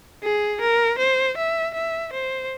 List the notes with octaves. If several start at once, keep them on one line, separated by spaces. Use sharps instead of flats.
G#4
A#4
C5
E5
E5
C5